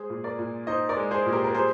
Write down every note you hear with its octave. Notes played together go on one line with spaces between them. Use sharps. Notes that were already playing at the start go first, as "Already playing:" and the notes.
Already playing: G#3 G#4 C5
A#2
A#4 D5
A#2
D#4 C5 D#5
A#4 D5
G#3
G#4 C5
A#2
G4 A#4
A#4
G3 G#4 C5